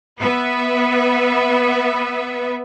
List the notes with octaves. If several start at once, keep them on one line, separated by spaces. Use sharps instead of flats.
B3 B4 E5